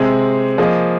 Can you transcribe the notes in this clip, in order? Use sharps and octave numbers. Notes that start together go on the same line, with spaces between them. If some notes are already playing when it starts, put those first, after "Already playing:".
Already playing: C3 G#3 C4 G#4
F3 A#3 G#4 D#5